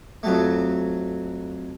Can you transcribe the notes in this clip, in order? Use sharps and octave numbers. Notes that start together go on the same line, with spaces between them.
F2 F#3 A3